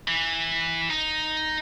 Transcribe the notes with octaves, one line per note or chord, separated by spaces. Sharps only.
E3
D#4